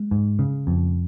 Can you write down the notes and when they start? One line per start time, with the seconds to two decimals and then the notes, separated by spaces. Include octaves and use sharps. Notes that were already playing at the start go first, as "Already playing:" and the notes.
Already playing: G#3
0.11 G#2
0.39 C#3
0.67 F2